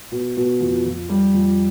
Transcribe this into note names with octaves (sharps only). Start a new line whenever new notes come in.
B2
B2
F2
F2
G3
F2